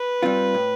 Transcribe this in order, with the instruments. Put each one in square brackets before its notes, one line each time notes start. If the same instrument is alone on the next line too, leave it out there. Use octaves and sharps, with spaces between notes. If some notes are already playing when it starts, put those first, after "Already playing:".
Already playing: [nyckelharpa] B4
[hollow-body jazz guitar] G3 C4 F4
A2